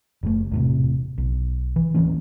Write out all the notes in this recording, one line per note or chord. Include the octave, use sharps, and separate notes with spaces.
F#1 A3
E1 A2 C3
B1
E3
D1 E3 A#3 C#4